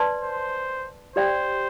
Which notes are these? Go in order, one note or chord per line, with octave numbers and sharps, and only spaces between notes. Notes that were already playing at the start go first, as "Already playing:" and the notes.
Already playing: B4 D5 A5 C6
C5
G4 C5 D5 G5